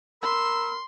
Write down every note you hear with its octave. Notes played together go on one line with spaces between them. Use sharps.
A#4 B5 C6 E6